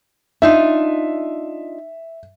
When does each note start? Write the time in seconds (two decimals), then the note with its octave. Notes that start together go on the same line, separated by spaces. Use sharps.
0.42 D4 D#4 F4 E5